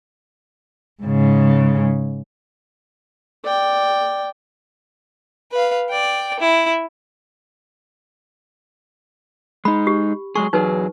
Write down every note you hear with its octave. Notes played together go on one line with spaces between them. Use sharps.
G#2 C#3
D5 G5
B4 F5
D5 G5
E4
G#3 D#4 B5
G4
F#3 G#3 G#4 C#6
E2 F#3 D#4 G#4 B4